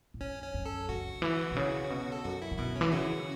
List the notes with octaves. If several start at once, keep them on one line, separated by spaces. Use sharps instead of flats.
A2
F#2 C#4
C#4
F#2
A4
C#3 F#4
E3
B2
C#3
B2
A4
F#2 F#4
E4
C#3
B2 E4
C#4
E3
C#3 F#4